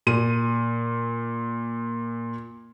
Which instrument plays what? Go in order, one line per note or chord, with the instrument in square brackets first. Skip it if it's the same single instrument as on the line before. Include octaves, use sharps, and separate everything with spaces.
[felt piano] A#2 D#7